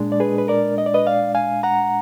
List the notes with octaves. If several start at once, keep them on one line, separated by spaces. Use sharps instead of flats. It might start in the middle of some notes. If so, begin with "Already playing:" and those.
Already playing: A#2 G#3 D4
D5
G#4 B4
B4
A#4 D5
D#5
D5
B4 D#5
D5 F5
F5 G#5
F#5 A#5